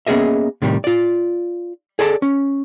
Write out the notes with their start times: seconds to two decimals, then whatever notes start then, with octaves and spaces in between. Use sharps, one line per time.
0.07 A#3 B3 C#4 G#4 D#5 E5
0.62 A2 C3 D#3 G3
0.84 F4 D5
1.99 G#4 A4 D5 A5
2.22 C#4